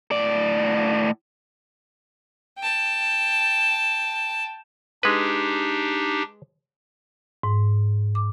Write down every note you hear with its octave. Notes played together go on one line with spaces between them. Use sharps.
A2 D5
G5 A5
G#3 D4 D#4 G4 B4
G#2
D6